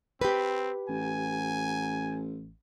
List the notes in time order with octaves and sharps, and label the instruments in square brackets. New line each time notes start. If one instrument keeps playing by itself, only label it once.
[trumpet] C4 [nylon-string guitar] G4 B4
[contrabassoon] A1 [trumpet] G#5